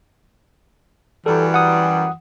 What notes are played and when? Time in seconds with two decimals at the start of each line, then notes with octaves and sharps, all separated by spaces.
1.26 F#2 E3 G3 A4
1.54 F#5 D#6